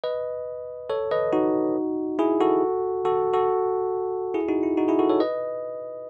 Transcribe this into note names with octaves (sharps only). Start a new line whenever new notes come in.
B4 D#5
A4 C#5
B4 D#5
D#4 F#4
E4 G#4
F#4 A4
F#4 A4
F#4 A4
E4 G#4
D#4 F#4
E4
D#4 F#4
E4 G#4
F#4 A4
A4 C#5
B4 D#5